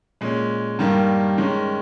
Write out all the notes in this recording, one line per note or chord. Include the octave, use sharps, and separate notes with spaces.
A#2 G#3 C#4
G2 D#3 G3 A#3
D#3 G#3 C#4